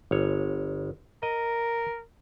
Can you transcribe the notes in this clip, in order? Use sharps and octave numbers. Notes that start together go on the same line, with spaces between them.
G1 C#5
A#4 D#5